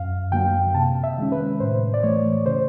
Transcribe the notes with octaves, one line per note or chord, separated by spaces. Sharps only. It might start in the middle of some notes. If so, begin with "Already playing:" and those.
Already playing: F#2 F5
D3 F#3 A#3 G5
C3 A5
E5
D#3 G#3 C#4
B4
A2 C5
D5
E3 A3 C#5
C#3 C5